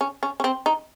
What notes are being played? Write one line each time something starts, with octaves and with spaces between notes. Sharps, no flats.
C#4
C#4
C#4
C4
D#4